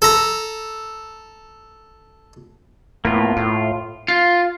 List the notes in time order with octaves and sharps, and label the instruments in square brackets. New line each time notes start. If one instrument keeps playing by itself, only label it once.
[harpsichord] A4 A#5
[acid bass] A2 [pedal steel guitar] A#3 B3 F4
[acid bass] A2 [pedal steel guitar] F4
[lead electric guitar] F4